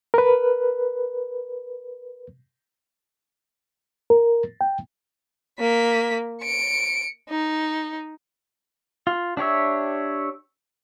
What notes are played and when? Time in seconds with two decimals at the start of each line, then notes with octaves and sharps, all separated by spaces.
0.14 A#4 B4
4.10 A#4
4.61 G5
5.59 A#3 B6
6.42 C#7 D7
7.30 D#4
9.07 F4
9.37 D4 G4 C#5 E5